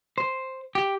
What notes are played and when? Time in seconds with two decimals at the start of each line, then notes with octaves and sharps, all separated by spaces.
0.18 C5
0.75 G4